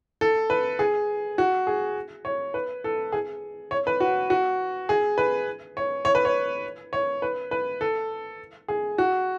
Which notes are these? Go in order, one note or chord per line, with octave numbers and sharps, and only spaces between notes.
A4
B4
G#4
F#4
G#4
C#5
B4
A4
G#4
C#5
B4
F#4
F#4
G#4
B4
C#5
C#5
B4
C#5
C#5
B4
B4
A4
G#4
F#4